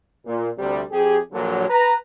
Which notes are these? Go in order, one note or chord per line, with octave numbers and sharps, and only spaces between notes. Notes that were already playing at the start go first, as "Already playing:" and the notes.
A#2
D2 C3 G3
F2 G4 G#4
A#1 A#2 D3 F#3
B4 A#5